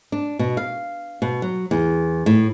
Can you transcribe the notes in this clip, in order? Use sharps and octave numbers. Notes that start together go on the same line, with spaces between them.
D4
B2
F5
B2
F#3
E2
A2